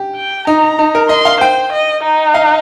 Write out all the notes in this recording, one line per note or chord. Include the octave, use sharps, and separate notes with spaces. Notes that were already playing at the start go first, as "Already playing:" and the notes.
Already playing: G4
G5
D#4 A#5
D#4
A#4
D#5 C6
F5
C5 G5
D#5
D#4
F5